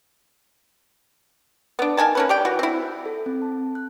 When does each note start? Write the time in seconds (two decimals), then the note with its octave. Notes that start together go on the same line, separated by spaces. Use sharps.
1.79 B3 D4
1.97 D#3 D#4 G#5 A5
2.15 A#3 C#4 B4
2.29 G4 D5 G5
2.45 E3 F#4
2.59 C4 E4
3.06 A4
3.26 C4
3.42 A5
3.75 F#6